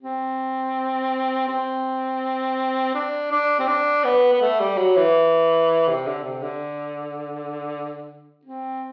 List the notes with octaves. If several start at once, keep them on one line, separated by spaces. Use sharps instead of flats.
C4
C4
D4
D4
C4
D4
B3
B3
A3
G3
F#3
E3
C3
D3
C3
D3
C4